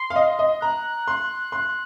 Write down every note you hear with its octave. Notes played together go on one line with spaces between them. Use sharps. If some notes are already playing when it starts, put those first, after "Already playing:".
Already playing: C6
F5
D#5
D#5
A#5 F#6
C6
C6